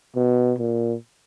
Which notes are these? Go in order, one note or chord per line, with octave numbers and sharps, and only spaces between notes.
B2
A#2